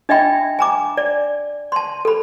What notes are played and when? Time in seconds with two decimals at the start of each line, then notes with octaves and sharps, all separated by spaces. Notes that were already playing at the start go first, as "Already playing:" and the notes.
0.09 D4 D#5 E5 G5 B5
0.59 G#5 A#5 D6
0.97 D5
1.72 A5 C6
2.05 A4 B5